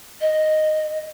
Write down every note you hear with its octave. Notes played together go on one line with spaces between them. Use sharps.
D#5